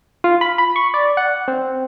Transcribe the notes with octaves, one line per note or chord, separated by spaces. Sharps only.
F4
B5
B5
C#6
D5
F#5
C4